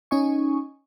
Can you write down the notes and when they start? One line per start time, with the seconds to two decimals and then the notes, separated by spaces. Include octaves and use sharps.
0.11 C#4 D#4 D#5 G#5 C#6